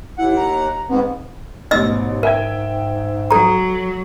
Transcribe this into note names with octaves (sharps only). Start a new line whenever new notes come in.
D#2 E4 F#5
A#5
G#2 B3 C4
A1 G#2 B2 D#5 E6 A6
A#4 E5 G5 G#6
F#3 A4 A#5